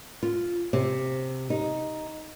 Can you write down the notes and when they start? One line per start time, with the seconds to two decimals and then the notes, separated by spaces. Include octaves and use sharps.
0.23 F4
0.73 C3
1.50 D#4